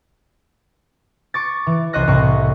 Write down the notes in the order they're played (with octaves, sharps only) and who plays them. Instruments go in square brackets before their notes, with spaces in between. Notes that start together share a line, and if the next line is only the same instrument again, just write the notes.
[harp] C#6 D6 A6
E3
C2 C5 C#5 D#5 F#6 A#6
C2 A2 C#6